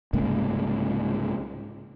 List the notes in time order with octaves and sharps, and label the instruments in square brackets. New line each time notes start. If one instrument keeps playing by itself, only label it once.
[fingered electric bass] C2 G#2 C#3 A#3